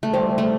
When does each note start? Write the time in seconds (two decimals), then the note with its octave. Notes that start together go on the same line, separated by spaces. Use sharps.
0.03 A3
0.13 G3 C5
0.38 A3